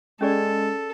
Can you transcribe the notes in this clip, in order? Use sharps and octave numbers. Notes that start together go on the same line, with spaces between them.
G#3 C#4 G#4 A4 D5